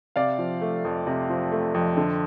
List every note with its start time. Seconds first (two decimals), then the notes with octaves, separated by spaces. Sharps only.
0.16 C3 D5 F5
0.38 F3
0.61 A3
0.85 F2
1.07 C3
1.29 F3
1.52 A3
1.74 F2
1.97 D3